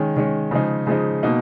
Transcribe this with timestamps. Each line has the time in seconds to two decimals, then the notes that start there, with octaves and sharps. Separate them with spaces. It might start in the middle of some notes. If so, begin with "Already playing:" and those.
Already playing: D#3 G#3 C#4
0.16 D#3 G#3 C#4
0.51 C#3 F3 G#3 D#4
0.87 C#3 F3 G#3 D#4
1.23 B2 A#3 D#4